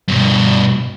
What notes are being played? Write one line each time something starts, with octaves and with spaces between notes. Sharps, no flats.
G2 B2